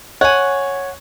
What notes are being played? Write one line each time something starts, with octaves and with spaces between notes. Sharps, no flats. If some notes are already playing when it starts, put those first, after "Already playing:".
C#5 F#5 G#5